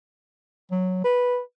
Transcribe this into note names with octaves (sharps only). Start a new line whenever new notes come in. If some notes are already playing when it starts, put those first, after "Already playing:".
F#3
B4